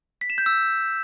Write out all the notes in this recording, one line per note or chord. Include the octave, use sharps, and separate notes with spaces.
B6
E7
G6
E6